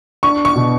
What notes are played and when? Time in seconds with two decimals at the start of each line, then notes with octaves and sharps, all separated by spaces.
0.23 D4 C#6
0.45 C#6
0.56 B2